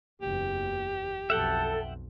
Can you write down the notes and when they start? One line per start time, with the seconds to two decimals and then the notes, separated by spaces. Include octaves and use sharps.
0.22 F#1 E2 G4
1.30 B1 F2 A4 E5 F#5 G5